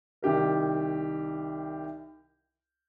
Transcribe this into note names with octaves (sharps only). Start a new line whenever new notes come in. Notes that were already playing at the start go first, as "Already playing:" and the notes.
C2 D#3 G4 A#4